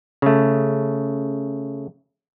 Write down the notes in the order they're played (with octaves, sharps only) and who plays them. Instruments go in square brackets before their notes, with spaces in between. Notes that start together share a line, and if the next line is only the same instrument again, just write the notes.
[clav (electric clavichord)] C#3 A3